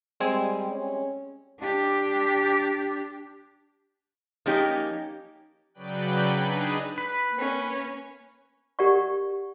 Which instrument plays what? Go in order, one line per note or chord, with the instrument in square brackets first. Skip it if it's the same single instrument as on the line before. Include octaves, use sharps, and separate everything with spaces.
[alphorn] G3 [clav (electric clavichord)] G#3 C4 G#5
[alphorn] C#4
[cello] D4 G4
[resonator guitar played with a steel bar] F3 A#3 C#4 D#4 G4
[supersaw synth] C#3 F#3 B4 D5 G5 F#6
D4 D#4 G#4 B4
[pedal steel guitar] B4
[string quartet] A#3 C#4
[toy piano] G4 A#4 D5 F#5 C#6